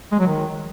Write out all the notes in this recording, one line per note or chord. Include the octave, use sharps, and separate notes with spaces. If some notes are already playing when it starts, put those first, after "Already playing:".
G#3
F#3
D#3